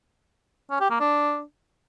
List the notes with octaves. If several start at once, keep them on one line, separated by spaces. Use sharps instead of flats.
C#4
G4
A#3
D4